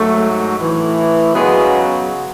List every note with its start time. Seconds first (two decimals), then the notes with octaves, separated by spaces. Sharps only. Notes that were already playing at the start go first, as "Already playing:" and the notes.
Already playing: G#2 F#3 A3
0.58 A2 E3
1.34 F#2 C#3 F#3 G#3 B3